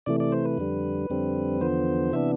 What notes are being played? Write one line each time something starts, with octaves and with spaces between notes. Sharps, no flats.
C3 E3 A3 D5
D5
C5
B4
F2 D3 G3
F2 D3 G3 C4
E2 D3 F3 B3 C5
C3 E3 B3 D4 E5